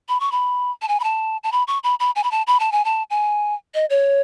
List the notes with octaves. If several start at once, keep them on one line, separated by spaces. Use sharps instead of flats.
B5
C#6
B5
A5
G#5
B5
A5
A5
B5
C#6
B5
B5
G#5
B5
A5
B5
A5
G#5
A5
G#5
D#5
C#5